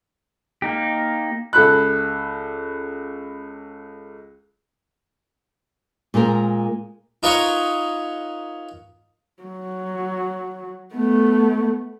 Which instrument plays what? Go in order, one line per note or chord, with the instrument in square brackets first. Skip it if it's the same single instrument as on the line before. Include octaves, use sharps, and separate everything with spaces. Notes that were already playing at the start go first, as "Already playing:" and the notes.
[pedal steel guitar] A#3 D#4 G4
[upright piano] C#2 A4 B5 F#6
[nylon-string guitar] A#2 G#3 C4 A#4
[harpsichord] D#4 F4 A#4 B4 C#5 D#5
[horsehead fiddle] F#3
A3 B3